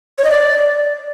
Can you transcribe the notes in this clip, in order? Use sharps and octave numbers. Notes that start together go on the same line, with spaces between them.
C#5
D#5
D5